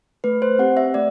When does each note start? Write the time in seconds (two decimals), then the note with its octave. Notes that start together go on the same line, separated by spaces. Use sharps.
0.24 A3 B4
0.42 C5
0.59 C4 G4 F#5
0.77 E5
0.94 A3 D5